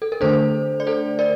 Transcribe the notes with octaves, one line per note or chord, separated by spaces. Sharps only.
A4
A#4
D3 A3 D4 A4 C5
D5
A4 C5
A#4 D5